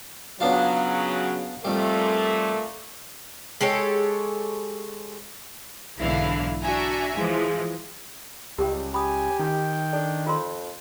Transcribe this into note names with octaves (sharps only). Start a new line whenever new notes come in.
C#3 F#3 B3 D4 F4
F2 A#2 G3 A3
G#3 G4 A4 C#5
B1 G#2 D3 E3 E4 F5
D4 F#4 E5 G#5 A#5
E3 F3 G#3
C#2 G3 G4 A#4 G5
G4 G#5 B5 D#6
D#3 D#4 G5
D4 A4
F2 F4 A#4 C6